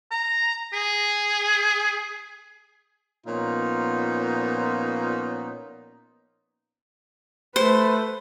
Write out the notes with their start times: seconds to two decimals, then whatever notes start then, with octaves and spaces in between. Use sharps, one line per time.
0.11 A#5
0.73 G#4
3.27 A#2 F3 B3 C#4 D#4 F4
7.56 A3 B4 C5